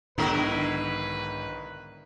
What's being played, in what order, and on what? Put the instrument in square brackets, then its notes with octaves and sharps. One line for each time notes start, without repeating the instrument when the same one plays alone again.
[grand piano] B1 D#3 A#6 [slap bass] G#2 [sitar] D3 E4 A#4 [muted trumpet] B4